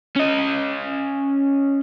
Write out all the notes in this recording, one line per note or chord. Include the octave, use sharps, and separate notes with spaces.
C#4 D#5